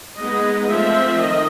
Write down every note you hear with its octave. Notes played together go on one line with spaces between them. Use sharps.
G#3 B3 D#4 D#5
F3 A3 C4 E5
D#3 D#5